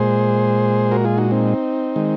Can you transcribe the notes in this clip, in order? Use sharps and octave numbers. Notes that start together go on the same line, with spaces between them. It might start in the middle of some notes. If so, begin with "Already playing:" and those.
Already playing: A#2 G#3 G#4 C5
F#4 A#4
F4 G#4
D#4 F#4
C4 D#4
D#3 G#3